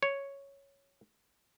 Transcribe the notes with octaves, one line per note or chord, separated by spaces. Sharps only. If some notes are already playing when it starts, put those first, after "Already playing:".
C#5